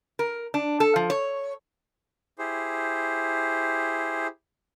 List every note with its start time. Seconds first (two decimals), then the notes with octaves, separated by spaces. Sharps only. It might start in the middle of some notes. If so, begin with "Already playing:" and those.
0.19 A#4
0.54 D4
0.80 A4
0.96 F3
1.10 C#5
2.38 E4 G4 G#4 C5